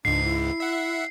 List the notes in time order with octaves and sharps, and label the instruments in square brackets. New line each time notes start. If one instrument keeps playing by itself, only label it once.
[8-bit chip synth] C#2 G#2 [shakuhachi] D4 [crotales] C7
[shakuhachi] E4
[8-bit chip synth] E5 F#5